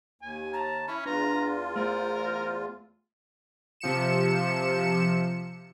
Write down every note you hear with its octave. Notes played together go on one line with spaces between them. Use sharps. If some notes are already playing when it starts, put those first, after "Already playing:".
D#2 G#5
A5 A#5
C#4 E4 B5
E2 D4 F4 B4 A#5
A3 A#4 C5
C3 F3 C#7 E7